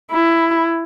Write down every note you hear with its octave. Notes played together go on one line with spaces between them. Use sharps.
E4